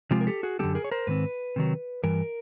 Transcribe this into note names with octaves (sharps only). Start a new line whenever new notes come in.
C3 F3 G#3 C4 F4 G4
A#4
G4 A4
F#4 G#4
F#2 D3 G3 B3 G4 A4
G#4 A#4
C#5
A#4 C5
G#2 D#3 C4 B4
C3 D#3 F#3
G2 E3 A#4